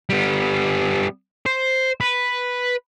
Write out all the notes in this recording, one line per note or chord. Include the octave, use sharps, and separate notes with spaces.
G3 B3
C5
B4